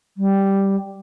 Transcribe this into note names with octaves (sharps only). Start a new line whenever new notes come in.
G3